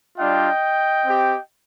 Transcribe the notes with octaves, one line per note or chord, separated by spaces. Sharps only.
G3 D4 F4 D#5 G5
C4 G4